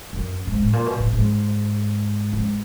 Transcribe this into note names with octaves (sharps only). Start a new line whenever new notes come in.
F#2
G#2
A2
A#2
B2
A2
G#2
G#2